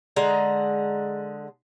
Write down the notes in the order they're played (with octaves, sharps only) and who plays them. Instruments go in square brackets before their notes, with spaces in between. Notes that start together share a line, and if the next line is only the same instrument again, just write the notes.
[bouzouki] D3 G#3 A#5